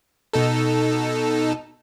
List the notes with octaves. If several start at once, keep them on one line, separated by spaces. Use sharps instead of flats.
B2 D#4 A4